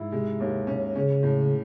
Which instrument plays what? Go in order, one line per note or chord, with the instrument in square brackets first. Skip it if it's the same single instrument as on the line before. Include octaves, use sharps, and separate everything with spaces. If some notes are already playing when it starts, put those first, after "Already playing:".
Already playing: [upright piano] G#2 E4
[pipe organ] C3 [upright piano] G#3
[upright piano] D#2
C#4
[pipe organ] C#3 [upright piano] C#4
[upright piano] A2